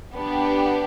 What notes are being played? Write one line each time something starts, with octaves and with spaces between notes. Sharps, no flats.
B3 D4 G4